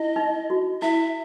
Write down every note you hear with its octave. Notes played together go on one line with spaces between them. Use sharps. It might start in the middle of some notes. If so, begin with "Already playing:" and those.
Already playing: E4 D#5
D#4
F#4
E4 E5